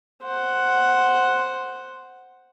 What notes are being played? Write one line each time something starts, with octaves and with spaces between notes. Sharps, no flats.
C5 F#5